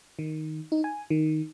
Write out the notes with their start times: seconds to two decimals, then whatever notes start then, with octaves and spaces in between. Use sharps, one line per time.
0.19 D#3
0.72 D#4
0.84 G#5
1.10 D#3